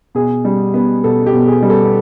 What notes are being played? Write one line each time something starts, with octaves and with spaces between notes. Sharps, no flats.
B2 G#4
G3
B3
B2 A4
G4
B2
G#4
G3
A4